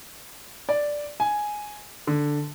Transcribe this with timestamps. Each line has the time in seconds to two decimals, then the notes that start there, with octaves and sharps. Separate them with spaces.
0.69 D5
1.20 G#5
2.07 D3